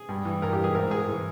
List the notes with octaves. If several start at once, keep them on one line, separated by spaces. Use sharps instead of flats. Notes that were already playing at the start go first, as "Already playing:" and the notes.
Already playing: G#4
G2
E3
G2 A#4
G4
E3
G#4
G#2 A#4
G#2 G#4
E3